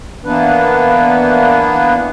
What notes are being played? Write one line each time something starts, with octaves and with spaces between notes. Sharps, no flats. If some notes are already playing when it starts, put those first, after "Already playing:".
E3 A#3 B3 D4 B4